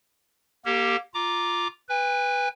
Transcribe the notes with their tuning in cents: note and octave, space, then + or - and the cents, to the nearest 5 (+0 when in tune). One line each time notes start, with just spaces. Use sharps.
A#3 +20 G4 +0 A#4 -45
F4 +0 A#5 +0 D6 +0
B4 +0 G#5 -45